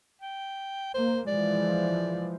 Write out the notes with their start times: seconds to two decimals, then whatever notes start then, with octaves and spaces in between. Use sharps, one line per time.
0.22 G5
0.94 A#3 C5
1.28 E3 F3 G#3 D5